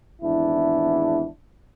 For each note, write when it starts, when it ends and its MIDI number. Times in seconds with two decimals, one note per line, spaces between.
0.20 1.25 32
0.20 1.25 40
0.20 1.25 62
0.20 1.25 64